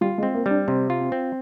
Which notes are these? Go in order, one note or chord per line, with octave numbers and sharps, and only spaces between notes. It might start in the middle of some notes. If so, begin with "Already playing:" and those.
G3 F4
G#3
C4
A#3
G3 D4
C3 C4
F4
C4
C4